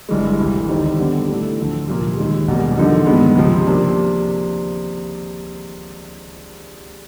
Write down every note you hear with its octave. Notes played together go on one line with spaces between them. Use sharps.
G1 G2 E3 G#3
D2 C3 E3
D#2 D#3 G3 C4 D#4
D3 G3 B3
A2 E3 A3 D4
D2 D3 F3
C2 A#2 F3 A#3
D#2 D#3 G#3
E1 E2 B2 G3 A#3
D3 F3 A#3 D#4
G2 D#3 G#3 B3
C#2 C3 F3
C3 F3 A#3 D4